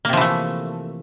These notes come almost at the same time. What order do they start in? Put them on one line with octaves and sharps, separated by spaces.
A#3 C3 F3 E3 A3